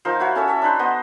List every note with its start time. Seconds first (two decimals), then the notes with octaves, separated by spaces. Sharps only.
0.05 F3 D#4 A#4 C5
0.20 E4 F#4 C#5
0.35 C#4 A4 C#5 E5
0.48 A4 E5
0.62 D4 D#4 B4 C5
0.79 B3 C5 D#5